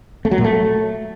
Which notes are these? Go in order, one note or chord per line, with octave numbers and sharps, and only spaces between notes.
A3
F#3
A#2
A3